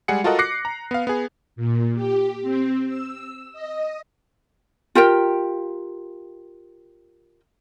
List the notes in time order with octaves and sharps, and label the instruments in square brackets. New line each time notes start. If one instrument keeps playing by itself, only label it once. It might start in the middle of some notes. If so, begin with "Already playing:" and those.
[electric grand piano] G3 G#3 G#4 F#5 C#7
F4 F#4 A4 A#4 D#5 F#5
D6 F#6 A#6 C7 C#7
A#5
B3 F5
B3 G#4
[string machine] A#2
G4
C4
E6
D#5
[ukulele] F4 G4 A#4 G5